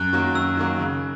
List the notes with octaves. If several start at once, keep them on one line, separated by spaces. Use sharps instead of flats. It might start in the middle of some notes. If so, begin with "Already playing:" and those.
Already playing: F#2 F#6
D#3 F#3 A#3
F#2 E6
D#3 F#3 A#3
C#3